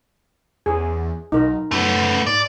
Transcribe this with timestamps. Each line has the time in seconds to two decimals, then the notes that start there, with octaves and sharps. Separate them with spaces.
0.66 E2 G#4
1.32 B1 D#4 A#4
1.71 F#2 A3 B3
2.26 G#2 D5